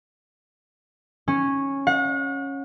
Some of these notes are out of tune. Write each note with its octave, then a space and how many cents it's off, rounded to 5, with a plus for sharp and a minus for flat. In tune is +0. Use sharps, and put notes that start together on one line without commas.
C#4 -10
F#5 -40